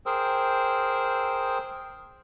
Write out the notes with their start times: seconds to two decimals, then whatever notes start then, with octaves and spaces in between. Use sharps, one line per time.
0.06 G#4 A#4 C5 G5 E6